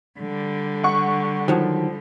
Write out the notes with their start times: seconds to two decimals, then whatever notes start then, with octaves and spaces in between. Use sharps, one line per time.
0.19 D3 G3
0.83 F#5 C#6
1.48 D#3 F3 F#3